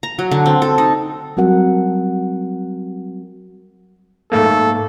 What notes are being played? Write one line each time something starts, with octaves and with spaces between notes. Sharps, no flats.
A#5
F#3
D3
C4
A4
D#4
F#3 G3 C4 F#4 A#4 F#5
G#2 A3 A#3 A4